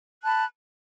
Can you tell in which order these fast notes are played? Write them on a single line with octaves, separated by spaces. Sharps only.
F#6 A5 B5